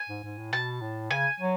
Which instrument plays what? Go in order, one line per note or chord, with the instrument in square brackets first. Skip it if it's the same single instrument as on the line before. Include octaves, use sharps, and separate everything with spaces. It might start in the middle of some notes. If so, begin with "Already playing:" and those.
Already playing: [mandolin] G#5
[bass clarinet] G#2
G#2
A2
[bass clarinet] B2 [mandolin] A5
[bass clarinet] A2
[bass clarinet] C#3 [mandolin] G#5
[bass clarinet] F#3